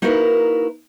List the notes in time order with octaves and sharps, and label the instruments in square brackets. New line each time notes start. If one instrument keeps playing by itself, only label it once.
[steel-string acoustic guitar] A#3 D#4 E4 F#4 A#4 B4